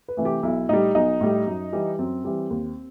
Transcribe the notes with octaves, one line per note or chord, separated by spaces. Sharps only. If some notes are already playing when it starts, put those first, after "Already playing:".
B4
C3 E3 A3
G4
B1 E4
A2 G3 D#4
B1 D#4
A2 G3
F#2
E3 G3
F#2 C4
E3 G3
D#2